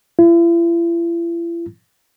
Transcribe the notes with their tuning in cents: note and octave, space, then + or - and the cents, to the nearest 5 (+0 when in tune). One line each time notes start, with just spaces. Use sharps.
E4 +45